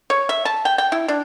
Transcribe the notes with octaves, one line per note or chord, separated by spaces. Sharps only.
C#5
E5
A5
G5
G5
E4
D4